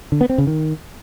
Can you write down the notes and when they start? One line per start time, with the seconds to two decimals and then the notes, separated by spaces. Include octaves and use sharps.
0.12 D3
0.21 B3
0.30 C4
0.38 C#3
0.47 D#3